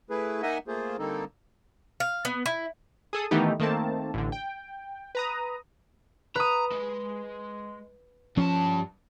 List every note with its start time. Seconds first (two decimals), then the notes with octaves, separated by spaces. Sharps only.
0.10 A3 E4 G#4 B4
0.42 A#3 D#4 D#5 E5 F#5 G#5
0.68 A3 A#3 F4 G#4 C5
0.99 D3 G3 A#3 C4 D#4 A4
2.00 F5
2.25 B3
2.46 E4
3.13 G#4 A4 D#6
3.31 D#3 E3 A3 B3 D#4 G4
3.60 D#3 A3 A#3 C4 A5
4.14 A1 D3
4.32 G5
5.15 B4 A#5 D#6
6.36 B4 A#5 D#6
6.71 G#3
8.37 G2 F3 C#4 A5